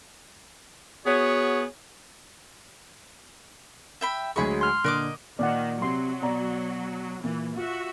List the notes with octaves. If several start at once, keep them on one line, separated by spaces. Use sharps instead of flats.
B3 F#4 G#4 C#5
E5 G5 B5
D2 F#3 G#3 G#4 B5 C#6
C6 F6
A#2 D3 A#4 D#5 D6 F#6
A#2 D#3 D5 F#5
C3 F#3 C6
B2 D5 A#5
A#2 E3
F4 F#4 E5